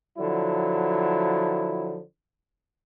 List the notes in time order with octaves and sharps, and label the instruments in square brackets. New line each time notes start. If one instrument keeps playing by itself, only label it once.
[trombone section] D3 F3 F#3 E4